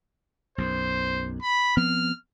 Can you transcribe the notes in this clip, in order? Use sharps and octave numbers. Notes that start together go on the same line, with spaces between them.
B1 F#2 C5
B5
F3 B3 C4 F6